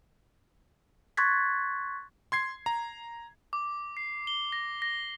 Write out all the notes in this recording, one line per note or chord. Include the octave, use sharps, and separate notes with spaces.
C6 C#6 F#6 G#6 A6 B6
C6 G#6 C7
A#5
D6
C7
G7
A#6
A#6